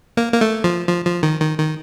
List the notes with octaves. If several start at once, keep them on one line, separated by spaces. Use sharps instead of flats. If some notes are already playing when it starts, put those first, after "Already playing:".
A#3
A#3
A3
F3
F3
F3
D#3
D#3
D#3